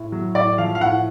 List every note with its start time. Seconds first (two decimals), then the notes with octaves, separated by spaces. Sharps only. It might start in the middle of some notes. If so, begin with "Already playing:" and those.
Already playing: A2
0.12 F#3
0.35 A2 D5
0.58 F3 F5
0.75 F5
0.81 A2 F#5